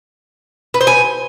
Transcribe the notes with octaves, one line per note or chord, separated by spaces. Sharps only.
B4
C5
G#5